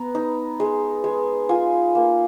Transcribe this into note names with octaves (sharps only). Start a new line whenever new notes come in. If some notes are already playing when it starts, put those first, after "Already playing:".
Already playing: B3 A#5
D#4
G#3
G#3
F4 G#5
A#3